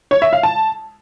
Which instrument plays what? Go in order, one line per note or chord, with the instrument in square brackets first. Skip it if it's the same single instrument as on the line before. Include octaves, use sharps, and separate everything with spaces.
[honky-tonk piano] C#5
E5
F5
A5